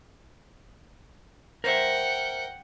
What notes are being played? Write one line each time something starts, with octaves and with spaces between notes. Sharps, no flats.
A#4 C5 E5 F#5 G5